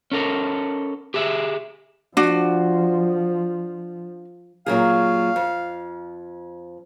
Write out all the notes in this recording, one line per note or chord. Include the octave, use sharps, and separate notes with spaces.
C#4 A4 A#4
G4 G#4 E5
F3 D4 F#4
A#2 F#3 G#4 F5
F2